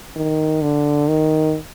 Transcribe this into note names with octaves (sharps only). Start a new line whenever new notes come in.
D#3
D3
D#3